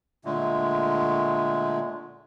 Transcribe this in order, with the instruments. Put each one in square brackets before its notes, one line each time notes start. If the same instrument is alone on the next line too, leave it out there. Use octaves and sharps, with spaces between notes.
[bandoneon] A#2 D3 G#3 A3